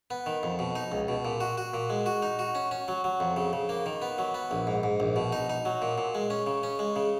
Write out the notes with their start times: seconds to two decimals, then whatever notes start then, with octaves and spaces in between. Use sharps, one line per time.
0.11 B3
0.26 D#3
0.43 F2
0.59 B2
0.75 D#4
0.92 C#2
1.08 B2
1.25 A#2
1.41 F#4
1.58 F#4
1.74 A#2
1.90 G#3
2.06 F#4
2.22 D#4
2.39 F#4
2.55 C#4
2.71 C#4
2.88 F#3
3.04 F#3
3.20 F2
3.37 C#3
3.53 C#3
3.69 A#3
3.86 D#3
4.02 B3
4.18 F#3
4.34 B3
4.51 A#1
4.67 G#2
4.83 G#2
5.00 A#1
5.16 B2
5.32 D#4
5.50 D#4
5.65 F#3
5.82 A#2
5.98 A#2
6.15 G#3
6.30 C#4
6.47 C#3
6.63 C#4
6.79 G#3
6.96 C#3